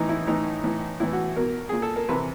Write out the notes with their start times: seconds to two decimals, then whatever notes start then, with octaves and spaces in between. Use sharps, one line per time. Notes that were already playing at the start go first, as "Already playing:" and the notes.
Already playing: A2 E3 D#4
0.09 E4
0.27 A2 E3 D#4
0.64 A2 E3
1.00 A2 E3 E4
1.13 F#4
1.36 B2 A#4
1.69 A#2 G#4
1.82 A4
1.96 A#4
2.09 C3 E3 B4